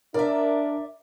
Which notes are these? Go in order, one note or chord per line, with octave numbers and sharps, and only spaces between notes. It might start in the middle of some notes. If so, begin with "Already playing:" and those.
D4 A#4 D5 E5